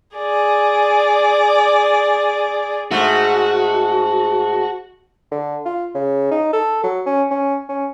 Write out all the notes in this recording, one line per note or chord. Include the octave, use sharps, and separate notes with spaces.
G#4 D5
G#2 A3 F#4
D3
F4
C#3
D#4
A4
F#3
C#4
C#4
C#4